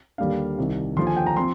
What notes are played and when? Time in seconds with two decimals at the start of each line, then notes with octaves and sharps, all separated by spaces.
0.18 D#2 D3 G3 A#3 D4 F5
0.58 C2 C3 D#3
0.97 D#2 D3 F3 C6
1.07 G#5
1.17 G5
1.26 A#5
1.37 F3 C4 C6